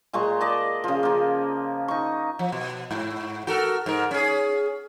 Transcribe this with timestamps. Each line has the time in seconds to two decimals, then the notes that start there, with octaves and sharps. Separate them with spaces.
0.13 A#2 G#3 A#5 C#6
0.41 D5 D#5 A5
0.84 C#3 F3
1.03 F3 A#3
1.88 D#4 C#6
2.39 F3
2.52 B2
2.91 G#2
3.47 F#4 A4 A#4
3.86 G#2 A#4
4.11 C#4 G#4